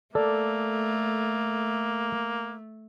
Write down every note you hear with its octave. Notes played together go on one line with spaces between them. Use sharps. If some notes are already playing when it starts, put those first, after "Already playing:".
A3 A#3 A4 D5